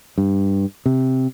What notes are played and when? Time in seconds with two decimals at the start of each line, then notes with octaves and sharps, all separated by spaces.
0.18 G2
0.86 C3